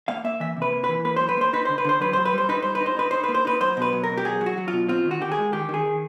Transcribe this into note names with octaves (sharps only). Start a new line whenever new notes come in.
A#3 F5
A#3 E5
E3 E5
C3
B4
A#3
E3 B4
A#3 B4
F#3 C5
B4
A#3 C5
D#4 B4
D3 C5
B4
D3 C5
F#3 B4
F#3 C5
B4
G3 C5
D#4 B4
G3 C5
B4
D#4
C5
D#4 B4
D#4 C5
B4
A#3
C5
D#4 B4
F#3 C5
B2 B4
F#3
A#4
B2
G4
F#3 G#4
F#3
F#4
F#3
F4
B2
C4 F4
D#3
F#4
D#3 G4
G#4
G#3
D#3 G4
D#3 G#4
D#3